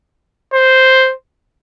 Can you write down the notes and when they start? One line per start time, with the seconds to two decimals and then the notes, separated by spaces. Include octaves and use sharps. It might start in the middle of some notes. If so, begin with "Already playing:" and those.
0.53 C5